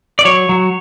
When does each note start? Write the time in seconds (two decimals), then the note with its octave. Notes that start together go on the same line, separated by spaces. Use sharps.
0.19 D5
0.25 F#3 C#5
0.49 F#3